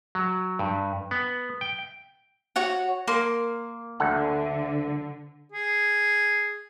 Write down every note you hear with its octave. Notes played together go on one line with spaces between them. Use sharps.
F#3
G2
B3
G5
F#4 C#5 F#5
A#3 C6
D2 D3 A4 F#5
G#4